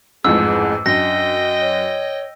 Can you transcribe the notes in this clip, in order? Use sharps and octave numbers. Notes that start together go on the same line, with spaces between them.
A1 F2 G#2 G#4 E6
F#2 D4 D#5 G5 A#6
C#5